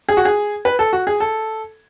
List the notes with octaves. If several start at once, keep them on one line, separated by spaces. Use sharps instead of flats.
G#4
F#4
G#4
B4
A4
F#4
G#4
A4